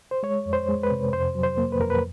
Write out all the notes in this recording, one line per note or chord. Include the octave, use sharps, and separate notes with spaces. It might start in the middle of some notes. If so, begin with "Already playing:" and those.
C5
G#3 C#5
F2
C5
G#3
B4
C3
F2 C5
F#3
C5
A#3
B4
F2 A#4
B4